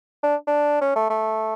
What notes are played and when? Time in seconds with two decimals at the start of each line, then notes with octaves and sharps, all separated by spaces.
0.23 D4
0.47 D4
0.81 C#4
0.96 A3
1.10 A3